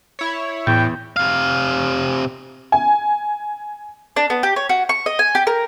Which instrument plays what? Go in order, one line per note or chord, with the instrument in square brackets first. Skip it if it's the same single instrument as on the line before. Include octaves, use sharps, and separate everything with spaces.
[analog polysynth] E4 C#5
[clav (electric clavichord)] E2 [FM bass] A2 [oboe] G5
[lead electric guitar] C3 F5
[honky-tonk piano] G#5
[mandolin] D4
B3
G4
C#5
F#4
C#6
D#5
G#5
G4
A#4